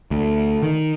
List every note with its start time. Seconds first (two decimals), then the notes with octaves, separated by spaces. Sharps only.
0.11 D2
0.63 D#3